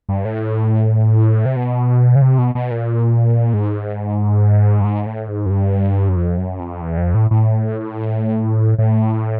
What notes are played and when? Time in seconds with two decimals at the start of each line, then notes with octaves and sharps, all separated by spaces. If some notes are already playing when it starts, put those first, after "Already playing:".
0.09 G2
0.25 A2
1.46 C3
1.56 B2
2.16 C#3
2.22 C3
2.38 B2
2.55 B2
2.71 A#2
3.54 G#2
4.81 G2
4.84 G#2
5.06 A2
5.28 G#2
5.46 F#2
5.50 G2
6.09 F#2
6.16 F2
6.38 F#2
6.60 F2
6.81 E2
6.98 F2
7.14 A2
7.31 A2
8.78 A2